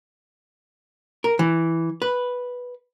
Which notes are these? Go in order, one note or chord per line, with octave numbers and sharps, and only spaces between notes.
A#4
E3
B4